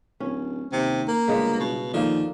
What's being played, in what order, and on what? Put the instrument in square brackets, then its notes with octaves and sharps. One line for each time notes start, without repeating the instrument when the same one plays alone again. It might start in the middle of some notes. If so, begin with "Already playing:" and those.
[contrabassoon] D1 [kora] C#4
[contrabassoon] D#2 [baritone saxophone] C3
[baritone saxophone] A#3
[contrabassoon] G1 [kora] C#3 G#3 B3
[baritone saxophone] B2
[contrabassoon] D#2 [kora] D3 A#3 [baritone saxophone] F3